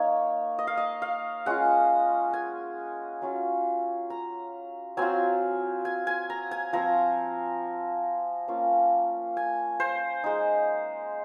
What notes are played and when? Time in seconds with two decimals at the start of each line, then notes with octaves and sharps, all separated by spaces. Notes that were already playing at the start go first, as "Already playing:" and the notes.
Already playing: A#3 D#4 C#5
0.59 D#5
0.67 F5
0.77 D#5
1.02 F5
1.46 G#3 C#4 F4 F#5
2.33 G#5
3.22 F#3 C#4 F4
4.10 A#5
4.97 F#3 C4 F4 G#5
5.85 G#5
6.07 G#5
6.30 A#5
6.51 G#5
6.73 F3 C4 F4 A#5
8.48 A#3 C#4 F4
9.37 G#5
9.80 C5
10.24 G#3 D#4